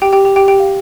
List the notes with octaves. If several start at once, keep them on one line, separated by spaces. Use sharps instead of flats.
G4 G5
G4 G5
G4 G5
G4 G5
G4 G5
F5